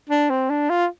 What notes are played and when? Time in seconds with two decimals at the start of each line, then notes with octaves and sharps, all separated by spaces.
0.10 D4
0.30 C4
0.50 D4
0.69 F4